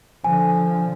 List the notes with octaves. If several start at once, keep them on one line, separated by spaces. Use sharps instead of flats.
D3 F3 G#5